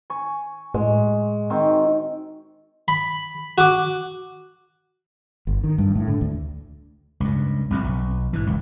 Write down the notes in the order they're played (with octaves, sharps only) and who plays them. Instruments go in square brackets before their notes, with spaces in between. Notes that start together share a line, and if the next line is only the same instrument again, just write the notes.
[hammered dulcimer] G#5 C#6
[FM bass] A2 [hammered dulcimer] G#3
[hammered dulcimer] D#3 C4 F#4
[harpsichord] B5
F#4 D6
[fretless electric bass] G1
D#3
G2
A2
D3
D2
[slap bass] C#2 G2
C2 F2 A2 C3
B1
G#2 E3
D1 C#2